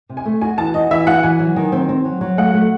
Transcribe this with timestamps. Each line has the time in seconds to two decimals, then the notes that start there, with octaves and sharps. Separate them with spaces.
0.09 C3
0.17 G#5
0.25 A3
0.41 F#4 G#5
0.58 E3 A5
0.74 F#4 D#5
0.91 E3 E5
1.07 F#4 F#5
1.23 E3 G#5
1.39 F#3
1.56 D#3
1.72 C4
1.89 C4
2.05 F#3
2.21 F#3
2.37 A3 F#5
2.54 A3